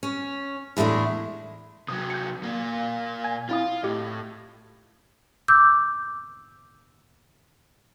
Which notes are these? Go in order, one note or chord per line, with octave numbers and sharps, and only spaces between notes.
C#4
E2 A2 G#3 A3 D4
C3 F#3 D#6
G6 C#7
A#2 A#3
G#5 G#6
C4 E4 F4 D#6
A2 G4 D#5
D6 E6 G6